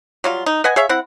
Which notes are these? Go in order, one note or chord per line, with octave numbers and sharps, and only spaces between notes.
F#3 G3 F4
D#4
B4 D#5 F#5 G#5
G#4 C#5 E5 F5
C4 E4 F#5